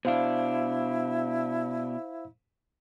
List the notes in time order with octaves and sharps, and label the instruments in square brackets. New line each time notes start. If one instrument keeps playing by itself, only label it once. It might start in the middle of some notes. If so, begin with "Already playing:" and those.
[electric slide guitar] B2 D4 [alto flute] E4 [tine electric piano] C5 F5